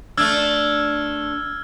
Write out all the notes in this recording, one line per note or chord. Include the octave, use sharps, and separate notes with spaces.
A3 D4 E6 F6 G#6